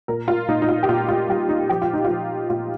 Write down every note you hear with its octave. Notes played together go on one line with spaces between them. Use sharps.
A#2 A#4
F4
A#2 D#4
D#4
F4
G4
A#2 F4
F4
G3 G4
D#4
F3 G4
F4
D#4
F4
F3
A#2 F4